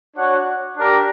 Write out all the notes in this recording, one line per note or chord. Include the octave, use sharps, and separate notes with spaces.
D4 F#4 C#5 F#5
D4 G4 A#4